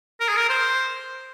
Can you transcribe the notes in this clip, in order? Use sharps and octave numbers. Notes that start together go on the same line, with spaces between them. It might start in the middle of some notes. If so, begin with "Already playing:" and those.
A#4
G#4
A#4
C5